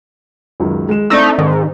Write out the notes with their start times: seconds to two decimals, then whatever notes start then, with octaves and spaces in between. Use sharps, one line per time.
0.60 C#2 F#2 D#3
0.89 G#3 E7
1.10 A3 C4 D4 D#4 D5
1.38 G#2 D#3